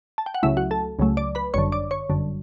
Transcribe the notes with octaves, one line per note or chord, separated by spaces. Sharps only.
A5
G5
F#5
C#2 C#3 F#3 A3 E4 E5
F#4 F#5
A4 A5
C#2 C#3 F#3 A3
D5 D6
B4 B5
G1 F#2 D3 C#5 C#6
D5 D6
C#5 C#6
G1 F#2 D3